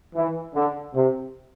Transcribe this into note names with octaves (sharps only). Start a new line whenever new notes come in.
E3
D3
C3